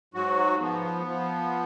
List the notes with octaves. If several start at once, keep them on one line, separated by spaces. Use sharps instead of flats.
G#2 F#3 F#4
F3 B3
F3